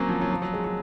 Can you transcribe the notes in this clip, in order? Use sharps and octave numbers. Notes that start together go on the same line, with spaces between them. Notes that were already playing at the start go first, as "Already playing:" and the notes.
Already playing: F#3 A#3 C4 C#4
F3
F#3
F3
F#3
G#3
F#3